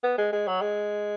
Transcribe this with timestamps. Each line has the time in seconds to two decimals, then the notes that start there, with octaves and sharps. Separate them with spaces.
0.03 B3
0.18 G#3
0.33 G#3
0.47 F#3
0.62 G#3